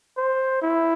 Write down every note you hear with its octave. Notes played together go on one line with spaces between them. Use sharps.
C5
E4